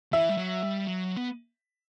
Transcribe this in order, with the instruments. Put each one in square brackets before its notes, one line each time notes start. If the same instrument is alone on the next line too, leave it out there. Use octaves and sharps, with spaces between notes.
[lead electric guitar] E3 [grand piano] E5
[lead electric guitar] G3
F#3
G3
F#3
B3